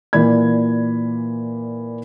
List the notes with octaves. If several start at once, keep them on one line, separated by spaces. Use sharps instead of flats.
A#2 E3 D5 B5 G#6